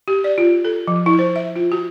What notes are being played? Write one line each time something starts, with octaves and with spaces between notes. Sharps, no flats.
G4
D5
F4
A4
F3
E4
C5
E5
F4
F#4